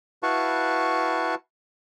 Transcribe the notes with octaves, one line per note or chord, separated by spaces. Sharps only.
E4 F#4 B4 F5 A5 C#6